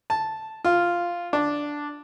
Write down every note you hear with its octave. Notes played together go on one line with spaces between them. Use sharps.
A5
F4
D4